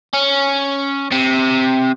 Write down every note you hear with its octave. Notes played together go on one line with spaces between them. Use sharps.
C#4
C3